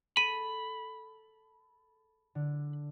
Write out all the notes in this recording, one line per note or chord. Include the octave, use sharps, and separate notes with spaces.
A4 B5 D#7
D3